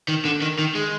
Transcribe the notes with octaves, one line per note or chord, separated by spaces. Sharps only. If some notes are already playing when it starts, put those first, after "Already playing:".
D#3
D3
D#3
D#3
G#3